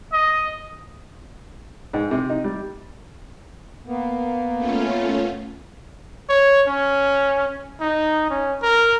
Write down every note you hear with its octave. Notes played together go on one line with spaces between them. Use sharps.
D#5
G#2
C3
D#4
G3
A#3 B3
A3 C#4 F4
C#5
C#4
D#4
C#4
A#4